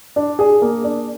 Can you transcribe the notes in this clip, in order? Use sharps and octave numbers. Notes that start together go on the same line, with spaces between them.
D4
G#4
A#3
D4